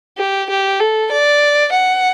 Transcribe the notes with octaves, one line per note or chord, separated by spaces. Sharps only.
G4
G4
A4
D5
F#5